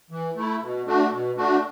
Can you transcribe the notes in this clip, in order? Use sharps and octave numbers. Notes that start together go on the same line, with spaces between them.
E3
A3 E4
B2
A3 D4 F#4
B2
A3 D4 F#4